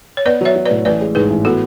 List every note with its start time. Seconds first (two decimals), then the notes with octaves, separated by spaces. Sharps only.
0.17 C#5
0.26 B3 B4 D5
0.41 F#3 C#5 E5
0.56 F#3
0.65 B4 D5
0.71 A2
0.85 A1 B4 D5
1.01 G#3
1.15 G#2 G#4 B4
1.30 A1
1.45 B3 F#4 A4